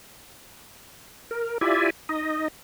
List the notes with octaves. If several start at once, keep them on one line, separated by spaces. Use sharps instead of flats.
A#4
E4 F4 G4 D5 E5 G#5
D#4 D#5